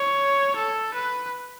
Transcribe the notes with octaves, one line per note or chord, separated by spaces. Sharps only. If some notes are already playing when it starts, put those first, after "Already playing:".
Already playing: C#5
A4
B4